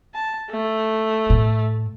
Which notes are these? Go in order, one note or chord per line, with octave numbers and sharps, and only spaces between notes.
A5
A3
A2